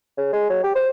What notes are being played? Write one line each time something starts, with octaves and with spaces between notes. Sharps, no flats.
C#3
G#3
F#3
G4
C5